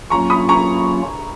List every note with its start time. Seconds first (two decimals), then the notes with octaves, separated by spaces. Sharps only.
0.10 F#3 A#3 C#4 F4 A#5 C#6
0.30 B5 D#6
0.49 A#5 C#6